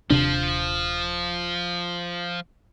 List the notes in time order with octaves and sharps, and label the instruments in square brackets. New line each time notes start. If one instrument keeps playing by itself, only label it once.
[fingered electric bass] D#1 C3 D4 [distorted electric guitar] F3